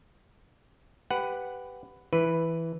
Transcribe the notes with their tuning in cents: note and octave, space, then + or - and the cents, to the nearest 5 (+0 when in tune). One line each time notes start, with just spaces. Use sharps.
G4 +0 B4 +15 F#5 +0
E3 +0 B4 +0